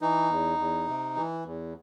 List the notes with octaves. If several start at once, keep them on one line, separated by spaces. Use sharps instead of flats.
E3 D#4
E2
E2
C3
E3
E2